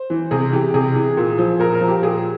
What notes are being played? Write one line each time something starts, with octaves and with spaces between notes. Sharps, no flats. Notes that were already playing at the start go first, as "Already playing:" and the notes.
Already playing: C5
E3
C3 G#4
E3 G4
C3 G#4
E3
A#2
F3
A#2 A#4
A#4
F3
G4
A#2 G#4